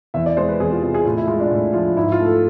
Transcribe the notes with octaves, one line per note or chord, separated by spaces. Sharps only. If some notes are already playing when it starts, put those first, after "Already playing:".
E2 E5
D5
G#3 C5
B4
E2 G#4
F4
C3 G#4
G#4
A2 F4
E4
G#3 F4
D4
A2
F3 F4
G#2 E4
F4
A3
A4